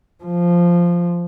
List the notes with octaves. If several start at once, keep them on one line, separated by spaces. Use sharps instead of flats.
F3